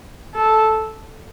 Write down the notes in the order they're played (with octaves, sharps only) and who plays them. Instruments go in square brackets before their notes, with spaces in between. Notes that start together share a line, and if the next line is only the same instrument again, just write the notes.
[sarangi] A4